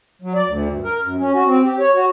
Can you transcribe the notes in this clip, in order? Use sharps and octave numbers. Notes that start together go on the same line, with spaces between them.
F#3
D5
D2
G2
A#4
F#2
C#4
F#4
C4
G4
C#5
F#4